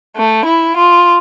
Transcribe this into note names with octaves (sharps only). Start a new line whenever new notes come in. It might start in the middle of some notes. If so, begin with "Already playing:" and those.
A3
E4
F4